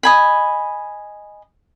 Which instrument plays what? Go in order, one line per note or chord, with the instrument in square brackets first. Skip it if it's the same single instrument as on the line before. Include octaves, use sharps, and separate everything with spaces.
[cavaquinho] D#5 G#5 B5